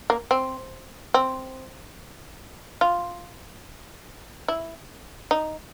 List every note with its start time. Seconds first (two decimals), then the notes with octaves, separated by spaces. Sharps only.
0.10 A#3
0.31 C4
1.14 C4
2.81 F4
4.48 E4
5.31 D#4